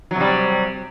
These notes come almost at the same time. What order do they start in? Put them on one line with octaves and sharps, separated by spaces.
F#3 C3 G3